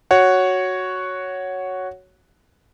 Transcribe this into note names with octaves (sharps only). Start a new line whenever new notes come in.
F#4 C#5 F#5